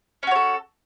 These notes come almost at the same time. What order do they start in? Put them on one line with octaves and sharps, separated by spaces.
C#4 F#4 C#5 A4